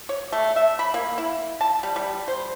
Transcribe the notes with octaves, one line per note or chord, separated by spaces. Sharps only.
C#5
A3
E5
B5
A#3
E4
A5
G3
G3
C5